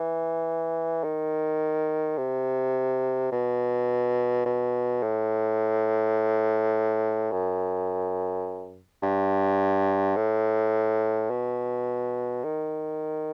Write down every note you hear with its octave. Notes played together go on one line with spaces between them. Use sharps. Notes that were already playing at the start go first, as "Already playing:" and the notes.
Already playing: E3
D#3
C3
B2
B2
A2
F#2
G2
A2
B2
D#3